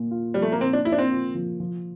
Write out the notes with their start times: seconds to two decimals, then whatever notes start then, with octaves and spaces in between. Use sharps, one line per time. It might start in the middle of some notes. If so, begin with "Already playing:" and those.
Already playing: A#2 A#3
0.11 F4
0.34 F3 G3
0.42 A3
0.52 A#3
0.60 A#2 C4
0.73 D4
0.85 A#3 E4
0.92 D4
0.98 C4
1.11 F4
1.35 F3
1.60 F3